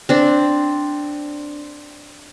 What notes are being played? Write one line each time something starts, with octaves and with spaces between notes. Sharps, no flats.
C4 D4